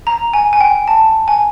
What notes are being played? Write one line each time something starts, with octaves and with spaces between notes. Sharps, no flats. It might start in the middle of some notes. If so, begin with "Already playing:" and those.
A#5
G#5
G#5
G5
A5
G#5